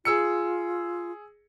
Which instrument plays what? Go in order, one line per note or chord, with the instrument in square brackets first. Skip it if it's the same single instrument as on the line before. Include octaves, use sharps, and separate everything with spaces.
[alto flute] F4 [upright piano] G#4 E6 C#7